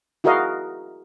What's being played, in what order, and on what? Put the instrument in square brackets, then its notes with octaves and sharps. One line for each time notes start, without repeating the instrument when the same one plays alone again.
[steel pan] E4 F#4 G#4 A#4 D#5 F5